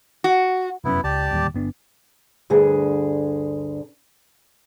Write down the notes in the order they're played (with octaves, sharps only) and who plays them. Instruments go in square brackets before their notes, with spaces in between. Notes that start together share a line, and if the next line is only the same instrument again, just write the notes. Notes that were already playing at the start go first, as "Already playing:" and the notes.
[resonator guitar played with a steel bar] F#4
[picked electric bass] F1 F#2 C#4 [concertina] B3 E4
[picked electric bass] C#2 [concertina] G4 D5 A5
[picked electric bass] D1 D#2 G3
G1 B3 D4
[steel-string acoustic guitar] D2 G2 D3 G#4